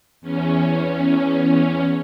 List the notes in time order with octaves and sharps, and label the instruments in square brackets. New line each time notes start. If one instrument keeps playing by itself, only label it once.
[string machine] E2 C#4